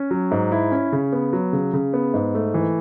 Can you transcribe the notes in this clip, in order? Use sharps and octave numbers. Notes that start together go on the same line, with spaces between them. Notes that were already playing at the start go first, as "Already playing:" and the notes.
Already playing: C#4
F#3
G#2
E4
C#4
C#3
B3
F#3
C#3
C#3
B3
G#2
A3
E3